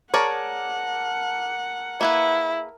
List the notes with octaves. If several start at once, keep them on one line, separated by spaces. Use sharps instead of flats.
G#4 A#4 C#5 D5 F#5 A5 D6
A#3 E4 G#4 B4